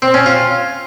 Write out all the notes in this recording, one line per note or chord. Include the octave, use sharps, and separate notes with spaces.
C4
C#4
F4